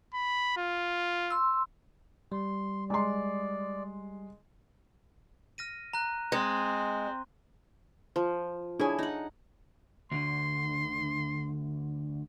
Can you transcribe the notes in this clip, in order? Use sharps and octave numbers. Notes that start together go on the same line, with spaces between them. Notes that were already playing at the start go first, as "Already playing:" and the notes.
B5
F4
C6 E6
G3 C6
G#3 D5 C6
F6 A#6 D#7
A#5 F#6
G#3 C4
F3
D4 E4 G#4 C#5 G#5
D#4 F#5
D2 D3 C6